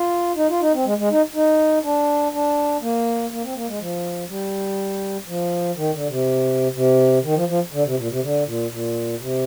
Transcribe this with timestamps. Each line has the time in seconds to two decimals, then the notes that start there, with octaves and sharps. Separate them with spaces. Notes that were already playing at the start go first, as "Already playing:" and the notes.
Already playing: F4
0.36 D#4
0.49 F4
0.61 D#4
0.74 C4
0.86 G#3
0.98 G#3
1.11 D#4
1.35 D#4
1.84 D4
2.33 D4
2.82 A#3
3.31 A#3
3.43 C4
3.56 A#3
3.68 G#3
3.80 F3
4.29 G3
5.27 F3
5.76 D#3
5.93 D3
6.09 C3
6.75 C3
7.24 D#3
7.36 F3
7.49 F3
7.72 D3
7.85 C3
7.97 A#2
8.09 C3
8.22 D3
8.46 A#2
8.71 A#2
9.20 C3